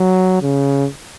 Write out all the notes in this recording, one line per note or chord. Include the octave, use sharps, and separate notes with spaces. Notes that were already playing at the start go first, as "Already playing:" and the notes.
Already playing: F#3
C#3